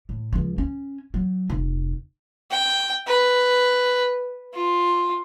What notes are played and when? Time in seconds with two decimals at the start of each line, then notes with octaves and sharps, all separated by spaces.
0.09 A2
0.33 C#2 F3
0.58 C#4
1.14 F#3
1.50 F1
2.51 G5
3.07 B4
4.54 F4